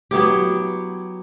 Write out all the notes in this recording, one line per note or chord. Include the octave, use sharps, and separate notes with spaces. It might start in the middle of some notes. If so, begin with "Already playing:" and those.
F#3 B3 E4 G4